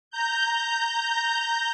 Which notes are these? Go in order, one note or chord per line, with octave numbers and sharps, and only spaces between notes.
A#5 G6